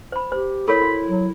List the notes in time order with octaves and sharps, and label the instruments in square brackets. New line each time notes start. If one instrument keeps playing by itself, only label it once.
[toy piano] C5 B5
[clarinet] G4 [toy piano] C5
[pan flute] E4 [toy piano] A4 A#4 C#5 [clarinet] B5
[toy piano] F#4
[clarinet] F#3